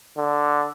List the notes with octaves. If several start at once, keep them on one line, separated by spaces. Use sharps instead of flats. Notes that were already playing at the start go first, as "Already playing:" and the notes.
D3